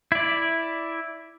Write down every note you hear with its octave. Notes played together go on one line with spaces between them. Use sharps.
E4 D5